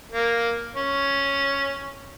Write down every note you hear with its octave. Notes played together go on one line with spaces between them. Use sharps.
A#3
C#4